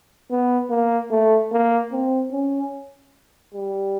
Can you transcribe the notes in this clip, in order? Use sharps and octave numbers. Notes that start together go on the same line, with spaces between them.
B3
A#3
A3
A#3
C4
C#4
G3